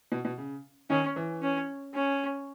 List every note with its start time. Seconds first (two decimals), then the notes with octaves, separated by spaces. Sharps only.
0.12 B2
0.25 B2
0.38 C#3
0.90 D#3 C#4
1.16 E3
1.42 C#4
1.94 C#4